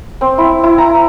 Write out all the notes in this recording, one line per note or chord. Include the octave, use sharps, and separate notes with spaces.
C4
E4
E4
A#5